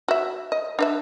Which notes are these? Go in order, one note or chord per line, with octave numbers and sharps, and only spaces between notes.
F#4 E5
D#5
D4 B4 E5